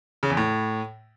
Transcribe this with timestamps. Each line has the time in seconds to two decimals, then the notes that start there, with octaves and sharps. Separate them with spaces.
0.23 C#3
0.30 E2
0.37 A2